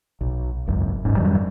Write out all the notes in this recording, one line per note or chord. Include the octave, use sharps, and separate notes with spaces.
B1
G#1 C#2 F#2
D#1 G#2 C#4
F2 D#3 F#3 G3